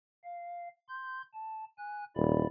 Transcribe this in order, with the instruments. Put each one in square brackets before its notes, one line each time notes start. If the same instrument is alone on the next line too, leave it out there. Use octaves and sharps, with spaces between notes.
[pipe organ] F5
C6 G6
A5
G#5 F#6
[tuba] D#1 [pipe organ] E4 D5 B5